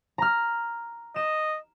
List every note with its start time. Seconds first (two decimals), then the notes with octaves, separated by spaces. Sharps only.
0.18 A#5 F6
1.16 D#5 E7